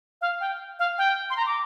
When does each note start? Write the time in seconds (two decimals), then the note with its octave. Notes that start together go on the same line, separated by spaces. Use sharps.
0.21 F5
0.41 G5
0.79 F5
0.98 G5
1.30 C6
1.37 A#5
1.46 D6